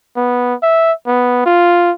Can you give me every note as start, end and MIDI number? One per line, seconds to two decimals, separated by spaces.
0.16 0.54 59
0.63 0.92 76
1.07 1.43 59
1.46 1.92 65